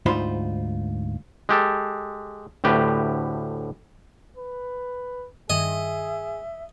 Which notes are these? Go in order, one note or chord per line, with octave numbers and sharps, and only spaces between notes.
D2 G#2 D#4 F4 C5 B5
G#3 G4 A4
D2 A2 G4 B4
B4
G2 D#3 G#4 D#5 E5